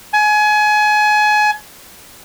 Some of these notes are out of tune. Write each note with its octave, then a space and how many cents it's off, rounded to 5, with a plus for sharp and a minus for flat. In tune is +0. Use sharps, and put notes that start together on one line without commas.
G#5 +30